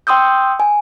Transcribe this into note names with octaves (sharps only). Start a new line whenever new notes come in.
G5 C6 D#6 E6 G6
G#5